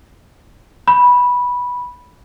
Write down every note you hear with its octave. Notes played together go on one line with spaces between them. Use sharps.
B5